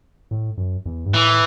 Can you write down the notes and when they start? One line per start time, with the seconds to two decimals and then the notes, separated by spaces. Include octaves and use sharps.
0.31 A2
0.58 F#2
0.86 E2
1.06 G2
1.13 A2 E3